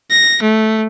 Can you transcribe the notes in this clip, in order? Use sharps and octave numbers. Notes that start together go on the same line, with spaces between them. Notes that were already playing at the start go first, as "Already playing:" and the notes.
A#6
A3